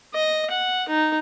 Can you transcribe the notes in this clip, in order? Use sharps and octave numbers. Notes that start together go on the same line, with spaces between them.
D#5
F#5
D#4